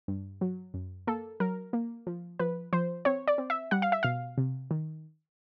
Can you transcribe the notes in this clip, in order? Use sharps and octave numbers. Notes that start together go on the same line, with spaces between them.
G2
F#3
F#2
A#3 A4
F#3 A#4
A#3
F3
F3 B4
F3 C5
C4 C#5
D5
C4
E5
G3 F#5
F5
E5
B2 F5
C3
D#3